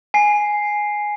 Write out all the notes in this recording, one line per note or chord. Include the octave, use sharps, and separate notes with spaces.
G#5 C7